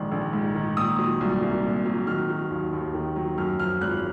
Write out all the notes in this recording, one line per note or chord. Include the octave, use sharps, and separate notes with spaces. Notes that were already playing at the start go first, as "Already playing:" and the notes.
Already playing: A#1 G#2 D#3
A#1
G#2
D#3
A#2 D#6
F#3
C2
C2
A#2
F#3
D#3 F6
F#3
D#2
D#2
D#3
F#3
F#2 F6
F3 F6
G#1 F#6